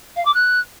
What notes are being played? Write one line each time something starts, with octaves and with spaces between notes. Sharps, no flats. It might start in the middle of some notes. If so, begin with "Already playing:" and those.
F5
D6
F#6